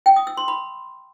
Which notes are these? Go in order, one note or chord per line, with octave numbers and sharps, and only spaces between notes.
G5
D#6
E6
C6
B5